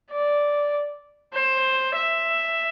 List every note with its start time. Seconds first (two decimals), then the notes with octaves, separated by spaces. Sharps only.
0.12 D5
1.34 C5
1.96 E5